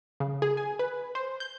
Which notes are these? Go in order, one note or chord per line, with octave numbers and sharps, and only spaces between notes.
C#3
G#4
G#5
B4
C5
G6